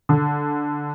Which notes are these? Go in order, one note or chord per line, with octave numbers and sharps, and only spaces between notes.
D3